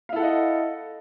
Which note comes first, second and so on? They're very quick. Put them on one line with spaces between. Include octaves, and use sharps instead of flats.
F5 E4 A4 F#5 D#5